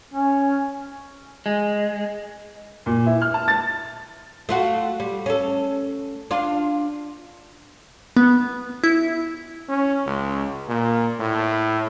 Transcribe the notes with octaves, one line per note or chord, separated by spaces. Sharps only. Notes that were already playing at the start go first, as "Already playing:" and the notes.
C#4
G#3
A#2
E4
F6
A5
A6
A3 F4 F#4
G3
C#4 A4
D4 F4
B3
E4
C#4
C#2
A#2
A2